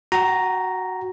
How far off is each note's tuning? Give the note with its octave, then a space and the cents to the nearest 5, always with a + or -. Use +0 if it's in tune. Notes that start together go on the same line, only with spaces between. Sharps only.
F#4 +0 G5 -35 A#5 +0